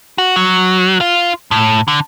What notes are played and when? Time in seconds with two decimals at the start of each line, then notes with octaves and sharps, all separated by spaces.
0.18 F#4
0.36 F#3
1.01 F4
1.51 A2
1.88 D3